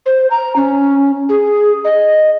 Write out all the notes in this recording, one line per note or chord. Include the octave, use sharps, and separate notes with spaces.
C5
A#5
C#4
G#4
D#5